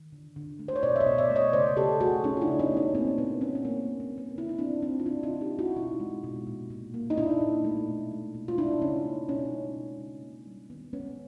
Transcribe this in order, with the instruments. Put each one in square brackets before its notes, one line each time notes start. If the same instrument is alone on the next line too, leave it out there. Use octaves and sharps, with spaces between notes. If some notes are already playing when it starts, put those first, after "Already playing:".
Already playing: [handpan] D#3
D3
D3
A3
C5
C#5
B2 C5 D5
E5
C#5 D#5
B2
D5 E5
A3
C#5 D#5
C#3 C5 D5
C#3 G4 A4
A3 F#4 G#4
C#3 C#4 D#4
F4
D4 E4
C#3
C#4 D#4
A3
B3 C#4
A#2 A#3 C4
A#2 B3
A#3 B3 C#4
C#4
A#2 A#3 C4
A#2
A#3
A3
B3
C#3 E4
D#4
C#3 C4 D4
A3 C4 D4
F4
C#3 D4 E4
D#4 F4
C#3
F4 G4
A#3
E4 F#4
B2 D#4 F4
G#3
B2
A#2
A#2
A#3
D#4
A#2 D4 E4
A#2
A3
B2
G#3
B2
F4
C#3 D4 E4
C#3 C#4 D#4
A#3
B2 C#4 D#4
G#3
B2
C#3
A#3
G3
D#3 B3
G#3 B3 C#4